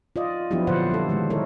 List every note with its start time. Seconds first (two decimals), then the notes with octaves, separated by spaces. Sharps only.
0.16 F4 D5 D#5
0.51 F3 F#3 B3 D4 E4 G4
0.67 A#2 D3 F3 C5 D5 F#5
0.90 G3 A4
1.09 D#3 G#3 E4
1.30 E4 A4 A#4 C#5